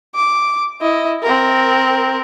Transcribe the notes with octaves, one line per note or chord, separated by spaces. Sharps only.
D6
E4 D#5
C4 A#4